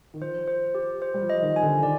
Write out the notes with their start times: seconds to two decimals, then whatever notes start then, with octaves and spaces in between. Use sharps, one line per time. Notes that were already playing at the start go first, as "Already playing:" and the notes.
0.14 D#3
0.21 F3 C5
0.47 C5
0.75 G4
1.02 C5
1.14 G3
1.22 F3
1.30 D#5
1.42 D#3
1.56 G#5
1.63 D3
1.83 D#3 D5